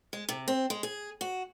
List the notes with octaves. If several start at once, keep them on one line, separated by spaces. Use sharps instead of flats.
G#3
C3
C4
G#3
G#4
F#4